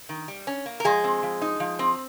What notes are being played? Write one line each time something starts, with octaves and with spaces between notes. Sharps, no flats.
D#3
G3
C#4
A#3
A#4
F3 G#3 G#4
C4
F3
D#4
F3
C4